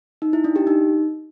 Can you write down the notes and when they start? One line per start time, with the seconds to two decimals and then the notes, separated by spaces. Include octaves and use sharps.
0.22 D#4
0.33 E4
0.44 D4
0.56 G4
0.67 D#4